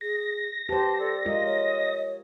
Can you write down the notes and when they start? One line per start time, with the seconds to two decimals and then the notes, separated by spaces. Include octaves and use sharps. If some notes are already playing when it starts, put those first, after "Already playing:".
0.01 G#4 A#6
0.69 G4 B4 C5 A5
0.98 A4 D5
1.25 G#3 F4 A#4 D#5
1.44 C#5